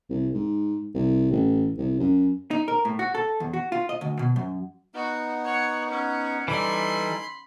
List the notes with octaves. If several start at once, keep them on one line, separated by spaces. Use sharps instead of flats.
C2
G#2
C2
A1
C2
F#2
D#4
A#4
A2
F#4
A4
E2
F#4
F4
D#5
D2
B2
F#2
B3 D#4 F#4
C#5 F#5
C#4 F#5
E3 G3 D#4 A4 G#5 B5 C6